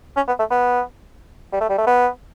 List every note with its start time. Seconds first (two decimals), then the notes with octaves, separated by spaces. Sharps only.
0.17 C#4
0.28 B3
0.39 A3
0.51 B3
1.53 G3
1.61 A3
1.70 G3
1.78 A3
1.87 B3